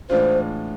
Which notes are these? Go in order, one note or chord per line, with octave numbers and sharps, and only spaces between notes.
A2 E3 G#3 D4 F4 C5